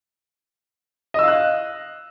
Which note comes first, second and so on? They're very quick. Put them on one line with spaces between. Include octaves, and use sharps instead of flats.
D#5 E6 F5 F#6